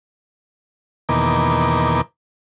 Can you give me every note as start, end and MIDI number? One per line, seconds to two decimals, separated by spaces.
1.09 2.01 40
1.09 2.01 47
1.09 2.01 51
1.09 2.01 58
1.09 2.01 86